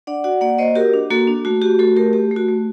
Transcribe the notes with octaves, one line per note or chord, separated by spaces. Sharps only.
D4 D5 F#5
F#4 D5 F#5
A#3 D5 F#5
A#3 C5 D#5
F#4 G4 A#4
D4
A#3 F#4 A4
D4
A3 F#4
F#4 G4
A3 F#4 A4
A3 G4 A#4
A3 G4
A3 F#4
A3